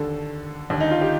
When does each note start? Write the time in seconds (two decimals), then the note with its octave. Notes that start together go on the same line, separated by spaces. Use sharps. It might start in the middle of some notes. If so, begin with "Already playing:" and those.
Already playing: D#2 D3 A4
0.70 D#2 D3
0.80 D#4
0.91 F4
1.01 G4